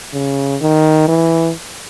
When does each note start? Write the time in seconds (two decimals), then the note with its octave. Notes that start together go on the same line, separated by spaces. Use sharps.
0.13 C#3
0.61 D#3
1.08 E3